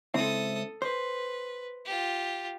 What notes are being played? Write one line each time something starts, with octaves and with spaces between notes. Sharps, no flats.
C#2 C4 E4 A4 D#6
B4 C5
F4 G4